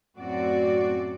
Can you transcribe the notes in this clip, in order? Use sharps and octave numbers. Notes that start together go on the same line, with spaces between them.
F#2 A2 C4 F#4 D5